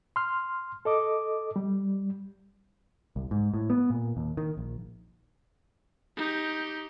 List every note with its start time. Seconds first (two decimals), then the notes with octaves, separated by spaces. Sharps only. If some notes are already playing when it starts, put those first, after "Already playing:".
0.16 C6 F6
0.85 A4 D#5 D6
1.56 G3
3.16 C2
3.31 G#2
3.54 A2
3.70 B3
3.90 A#2
4.17 D#2
4.37 D#3
4.57 A#1
6.17 D#4 G4